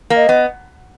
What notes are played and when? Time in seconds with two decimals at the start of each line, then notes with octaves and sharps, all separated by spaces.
0.10 A#3
0.16 D#5
0.29 B3